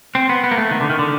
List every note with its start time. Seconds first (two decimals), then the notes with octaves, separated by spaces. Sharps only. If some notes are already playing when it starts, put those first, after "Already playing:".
0.15 C4
0.29 B3
0.44 B3
0.51 A#3
0.57 A3
0.71 D#3
0.81 D3
0.90 D#3
0.99 D3